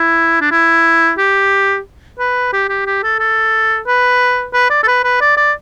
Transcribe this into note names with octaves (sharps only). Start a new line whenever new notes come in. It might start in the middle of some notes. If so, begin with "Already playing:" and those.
Already playing: E4
D4
E4
G4
B4
G4
G4
G4
A4
A4
B4
B4
D5
A4
B4
B4
D5
D5